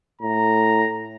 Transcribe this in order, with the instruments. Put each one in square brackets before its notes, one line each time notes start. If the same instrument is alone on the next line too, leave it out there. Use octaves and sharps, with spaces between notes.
[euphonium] A2 [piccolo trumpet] A#5